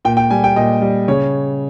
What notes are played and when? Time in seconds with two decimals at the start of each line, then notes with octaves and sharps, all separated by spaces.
0.05 A#2 G5
0.17 G5
0.30 G3 G#5
0.44 G5
0.56 A#2 D#5
0.81 G3
1.08 C#3 C#5